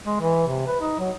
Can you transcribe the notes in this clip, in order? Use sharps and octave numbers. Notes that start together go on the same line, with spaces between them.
G#3
E3
C3
B4
D#4
F#3